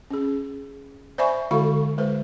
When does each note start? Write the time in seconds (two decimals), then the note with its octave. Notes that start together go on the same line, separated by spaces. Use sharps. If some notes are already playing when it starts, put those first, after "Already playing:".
0.11 C#4 G#4
1.18 C5 D5 E5 G#5 B5 C#6
1.51 D3 G#3 F#4 A4 F5 C#6
1.98 G#3 B4 C5